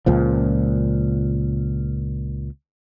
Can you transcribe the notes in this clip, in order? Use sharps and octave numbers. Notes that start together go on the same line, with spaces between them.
C#2 A#2 F3